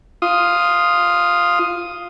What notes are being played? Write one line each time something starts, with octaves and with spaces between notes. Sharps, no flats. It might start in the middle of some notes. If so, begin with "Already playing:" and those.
F4 D#6